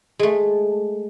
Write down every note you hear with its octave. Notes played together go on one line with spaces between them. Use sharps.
G#3 A3